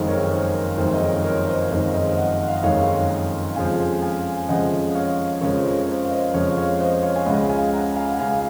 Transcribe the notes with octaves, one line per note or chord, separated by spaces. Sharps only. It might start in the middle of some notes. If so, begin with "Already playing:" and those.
Already playing: F#1 F2 D#3 G#3 C5 D#5
A#4 C#5
C5
A#4
F#1 F2 D#3 G#3 C5
D#5
A#4 C#5
A#4 C#5
C5 D#5
C#5
F#1 F2 D#3 G#3 C5
C5 D#5
D#5 F#5
F#5
F5
D#5
F#1 F2 D#3 G#3 C#5 F5
F2 C#3 F3 G#3 F5 G#5
F5 G#5
F2 C#3 F3 G#3 D#5 F#5
C#5 F5
F2 C#3 F3 G#3 A#4 C#5
C5
A#4
C#5
C5
F5
C5 D#5
F2 C#3 F3 G#3 C#5 F5
C#5 F5
C5 D#5
C#5 F5
G#5
C#2 C#3 G#3 D#5 F#5
F5 G#5
F#5 A#5
F5 G#5
F#5
C#2 C#3 G#3 F5 G#5